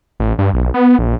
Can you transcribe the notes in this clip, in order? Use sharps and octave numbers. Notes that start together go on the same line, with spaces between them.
A1
G2
B1
B3
A#1